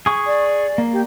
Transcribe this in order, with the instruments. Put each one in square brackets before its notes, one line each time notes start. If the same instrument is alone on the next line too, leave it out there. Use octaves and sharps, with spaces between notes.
[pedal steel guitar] G#4 C#6
[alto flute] D5
[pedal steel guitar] A#3
[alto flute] G4